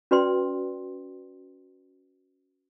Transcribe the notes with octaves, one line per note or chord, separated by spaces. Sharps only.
C#4 F#4 B4 D5 G5 C6